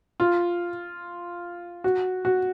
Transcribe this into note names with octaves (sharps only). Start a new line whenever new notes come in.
F4
F#4
F#4